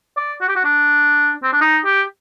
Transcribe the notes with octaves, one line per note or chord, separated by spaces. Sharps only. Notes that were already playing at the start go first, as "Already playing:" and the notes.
D5
F#4
G4
F#4
D4
C4
D4
D#4
G4